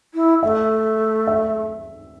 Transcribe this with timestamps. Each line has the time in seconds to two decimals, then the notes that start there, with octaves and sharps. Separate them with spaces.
0.14 E4
0.43 A3 E5
1.27 E5